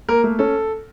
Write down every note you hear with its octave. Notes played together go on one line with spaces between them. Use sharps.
A#3 A#4
A3
C#4 A4